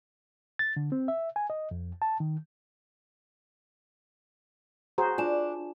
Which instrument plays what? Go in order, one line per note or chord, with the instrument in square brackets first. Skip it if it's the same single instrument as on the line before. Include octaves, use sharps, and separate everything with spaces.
[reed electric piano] A6
D3
C4
E5
G#5
D#5
F2
A5
D#3
[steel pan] F#4 G#4 C5 [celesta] A#5
[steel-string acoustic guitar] D4 [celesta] F4 G#5 E7